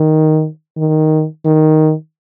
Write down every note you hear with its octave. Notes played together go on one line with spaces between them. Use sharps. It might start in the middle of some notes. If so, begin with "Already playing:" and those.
Already playing: D#3
D#3
D#3